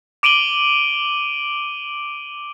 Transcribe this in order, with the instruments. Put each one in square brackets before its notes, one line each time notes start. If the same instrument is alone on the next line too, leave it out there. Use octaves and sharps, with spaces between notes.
[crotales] D6 D7 D#7 F#7 G7